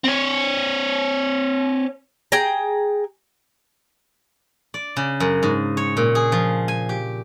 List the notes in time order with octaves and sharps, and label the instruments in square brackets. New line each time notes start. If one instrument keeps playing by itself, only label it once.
[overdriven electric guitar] C4 C#5
[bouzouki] G#4 G5 A#5
[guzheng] D5
C#3
F#2
G#2
C#5
A#2
G#4
F3
G#5
G4